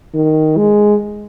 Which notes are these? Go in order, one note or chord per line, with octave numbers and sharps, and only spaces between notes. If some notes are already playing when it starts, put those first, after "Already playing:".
D#3
G#3